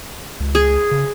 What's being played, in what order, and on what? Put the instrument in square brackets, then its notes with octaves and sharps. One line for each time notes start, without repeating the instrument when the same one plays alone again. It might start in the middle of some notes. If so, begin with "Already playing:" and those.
[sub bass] C#2
[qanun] G#4
[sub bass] C#3